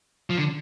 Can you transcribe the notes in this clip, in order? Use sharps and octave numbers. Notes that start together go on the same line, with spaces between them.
F3
D3